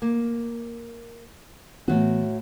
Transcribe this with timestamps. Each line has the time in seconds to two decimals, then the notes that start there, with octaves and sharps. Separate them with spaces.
0.02 A#3
1.88 A2 E3 B3 F#4